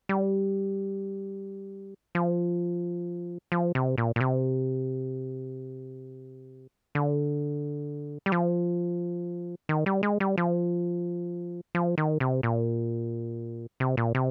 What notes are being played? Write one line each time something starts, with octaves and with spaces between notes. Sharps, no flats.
G3
F3
F3
C3
A#2
A#2
C3
D3
G3
F3
D#3
G3
G#3
G3
F3
F3
D#3
C3
A#2
C3
A#2
C3